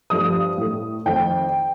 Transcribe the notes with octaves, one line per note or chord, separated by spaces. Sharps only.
G2 F3 A3 D#6
A2 A3
F2 D#3 A3 G5